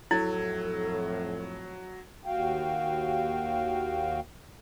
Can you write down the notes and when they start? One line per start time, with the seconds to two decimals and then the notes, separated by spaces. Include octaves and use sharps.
0.11 F2 A2 F#3 E4 A4 G#6
2.26 D#2 F#4 F5 G5